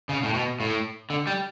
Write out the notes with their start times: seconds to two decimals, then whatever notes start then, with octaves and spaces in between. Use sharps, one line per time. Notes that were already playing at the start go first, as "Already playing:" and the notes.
0.09 C#3
0.23 A2
0.34 B2
0.60 A2
1.10 D3
1.27 G3